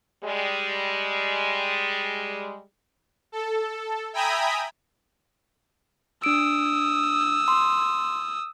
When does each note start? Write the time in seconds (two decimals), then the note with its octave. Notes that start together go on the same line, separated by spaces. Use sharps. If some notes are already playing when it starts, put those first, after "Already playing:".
0.24 G3 G#3
3.32 A4
4.13 E5 G5 G#5 A#5 B5 D#6
6.24 D4 D#6 E6 D7
7.48 C6